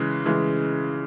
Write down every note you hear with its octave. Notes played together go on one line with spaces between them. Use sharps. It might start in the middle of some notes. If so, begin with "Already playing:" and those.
Already playing: C#3 E3 G#3
C#3 E3 G#3